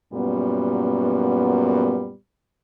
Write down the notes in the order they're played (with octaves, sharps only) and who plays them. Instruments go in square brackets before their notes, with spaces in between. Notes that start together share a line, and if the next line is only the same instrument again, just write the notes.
[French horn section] F#2 A#2 G3 B3